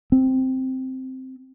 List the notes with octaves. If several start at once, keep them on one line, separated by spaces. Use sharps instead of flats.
C4